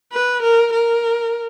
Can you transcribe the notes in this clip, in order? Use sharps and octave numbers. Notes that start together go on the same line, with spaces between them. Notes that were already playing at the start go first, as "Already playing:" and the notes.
B4
A#4
A#4